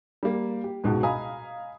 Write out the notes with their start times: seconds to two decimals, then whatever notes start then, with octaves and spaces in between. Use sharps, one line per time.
0.23 G3 A#3
0.64 G4
0.84 C#2 G#2 B2 F#4 F#5 A5
1.03 D#5 F5 G#5 A#5 B5 D#6